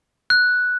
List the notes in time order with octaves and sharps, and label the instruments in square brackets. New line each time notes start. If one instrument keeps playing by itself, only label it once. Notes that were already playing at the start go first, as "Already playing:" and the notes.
[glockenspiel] F#6